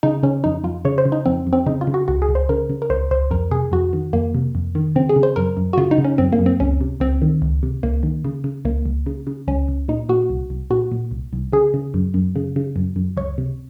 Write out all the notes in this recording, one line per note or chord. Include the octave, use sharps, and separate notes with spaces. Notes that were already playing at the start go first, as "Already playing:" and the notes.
C#3 D#4
C#3 C#4
F2 D#4
F2 F4
C#3 C#5
C5
C#3
D#4
F2 C4
F2
C4
C#3 D#4
F4
C#3
F#4
C#2 F#4
G#4
C#2
C5
C#3 A#4
C#3
A#4
C#2 C5
C#2 C5
F2 A#4
C3 G#4
F2 F#4
D#3
F2 A#3
C3
F2
D#3
C#3 C4
G#4
C#3
C5
F#2 A#4
F#2
F#4
C#3 F4
D#4
C#3
C#4
F#2 C4
A#3
F#2
C4
C#2 C#4
C3
C#2 C4
D#3
C#2
C3
C#2 A#3
D#3
C#3
C#3
C#2 A#3
C#2
C#3
C#3
C#2 C#4
C#2
A#2 D#4
A#2 F#4
C2
C2
A#2 F#4
A#2
C2
C2
C#3 G#4
C#3
F#2
F#2
C#3
C#3
F#2
F#2
C#2 C#5
C3